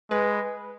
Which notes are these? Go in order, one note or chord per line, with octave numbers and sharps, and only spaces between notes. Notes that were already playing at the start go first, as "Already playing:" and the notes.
G#3 B4